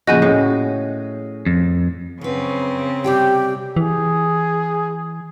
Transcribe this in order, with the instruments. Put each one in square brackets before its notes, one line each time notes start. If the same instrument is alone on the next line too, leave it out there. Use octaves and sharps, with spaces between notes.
[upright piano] A#2 C#3 F3 [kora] F#4 [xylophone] D#5 G#5 G6
[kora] A2 [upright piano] C#4 G#4
[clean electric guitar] F2
[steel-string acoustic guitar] F#2 B4 [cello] C#3 C4
[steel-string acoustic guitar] C3 G3 G5 [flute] G4
[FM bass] E3 [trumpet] G#4